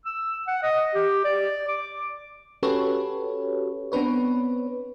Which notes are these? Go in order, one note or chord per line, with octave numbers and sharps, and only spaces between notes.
E6
F#5
D#5
G4
D5
D6
C#4 F#4 G4 A4 B4 C#5
B3 C4 D4 B4 C#5